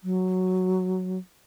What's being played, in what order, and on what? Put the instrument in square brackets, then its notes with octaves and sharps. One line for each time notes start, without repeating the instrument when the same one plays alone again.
[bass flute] F#3